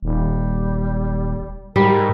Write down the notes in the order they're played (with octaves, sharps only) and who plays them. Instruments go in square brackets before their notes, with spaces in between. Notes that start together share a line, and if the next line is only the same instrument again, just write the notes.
[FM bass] D#1 [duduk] G3
[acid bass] G#2 [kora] G3 [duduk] A#4